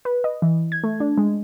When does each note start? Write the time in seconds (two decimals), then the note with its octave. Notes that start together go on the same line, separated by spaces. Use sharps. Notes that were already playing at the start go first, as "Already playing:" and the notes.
0.05 B4
0.24 D#5
0.42 E3
0.72 G#6
0.84 A3
1.00 D4
1.18 G#3